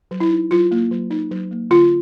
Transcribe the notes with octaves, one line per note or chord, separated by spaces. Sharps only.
F#3
E4
D#4
F#3 F4
A#3
F#3
D#4
F#3
A#3
D3 F4